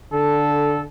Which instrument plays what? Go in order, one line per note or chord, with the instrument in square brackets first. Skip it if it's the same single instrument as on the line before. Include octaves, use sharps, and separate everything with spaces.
[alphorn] D3 [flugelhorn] A4